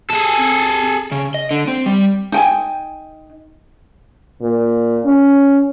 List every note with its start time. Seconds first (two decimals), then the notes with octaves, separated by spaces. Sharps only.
0.10 G#4 A4
0.37 C4
1.12 C#3
1.34 D#5
1.51 D3
1.68 C4
1.86 G3
2.32 D#4 G5 G#5
4.42 A#2
5.05 C#4